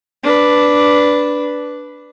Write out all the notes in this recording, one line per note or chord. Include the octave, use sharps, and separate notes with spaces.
D4 B4